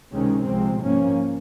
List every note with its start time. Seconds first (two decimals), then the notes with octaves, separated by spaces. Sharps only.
0.11 C#2 C3 D#3 G#3 C#4
0.45 C2 C3 F3 G#3 C4
0.80 G#2 F3 A#3 C#4